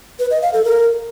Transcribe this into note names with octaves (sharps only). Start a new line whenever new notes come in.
B4
D#5
F5
A4
A#4